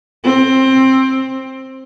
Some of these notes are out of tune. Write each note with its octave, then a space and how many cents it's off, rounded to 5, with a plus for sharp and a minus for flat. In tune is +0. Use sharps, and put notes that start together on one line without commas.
C4 +15